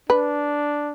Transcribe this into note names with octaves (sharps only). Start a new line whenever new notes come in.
D4 B4